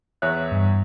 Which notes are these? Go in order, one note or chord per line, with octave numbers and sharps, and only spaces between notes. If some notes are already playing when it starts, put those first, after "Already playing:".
E2 C#5 E5 F#6
G2